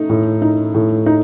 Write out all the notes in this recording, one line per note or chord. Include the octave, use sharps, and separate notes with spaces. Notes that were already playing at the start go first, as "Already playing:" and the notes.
Already playing: A3 D#4
A2
D#4
A2
D#4